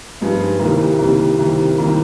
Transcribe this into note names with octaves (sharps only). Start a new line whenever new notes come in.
G2 F3 G#3 D#4
C2 C3 D#3 G3 A#3
C2 C3 D#3 G3 A#3
C2 C3 D#3 G3 A#3
C2 C3 D#3 G3 A#3